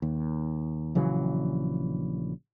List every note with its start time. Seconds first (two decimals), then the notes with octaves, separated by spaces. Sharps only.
0.02 D#2
0.95 A#1 C#3 E3 F#3